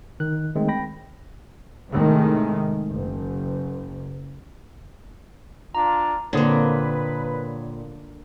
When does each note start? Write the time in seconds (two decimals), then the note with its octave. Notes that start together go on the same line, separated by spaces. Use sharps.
0.20 D#3 F#6
0.55 D#3 G#3 A3 C4
0.68 G5 B5 A#6
1.91 A2 C3 D#3 G#3 A3
2.91 F#1
5.75 D4 F4 A#5
6.33 A#2 D3 A#3 C4 B4 C#5 D#6